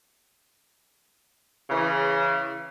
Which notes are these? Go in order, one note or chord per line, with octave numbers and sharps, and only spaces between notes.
C#3 E3